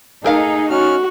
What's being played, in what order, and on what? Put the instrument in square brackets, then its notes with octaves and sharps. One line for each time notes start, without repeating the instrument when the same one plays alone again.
[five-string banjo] A3 A#4 F5 [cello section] D#4 [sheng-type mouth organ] G#4
[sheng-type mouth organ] C#4 F6 [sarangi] F#4